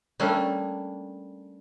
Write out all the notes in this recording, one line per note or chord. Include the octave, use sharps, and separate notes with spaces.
G3 A3 A#3 C#4 D4